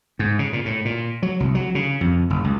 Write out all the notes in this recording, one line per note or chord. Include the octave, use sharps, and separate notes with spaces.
G#2
C#3
A#2
A2
A#2
F#3
C2
F#3
C#3
F2
F#1
C#2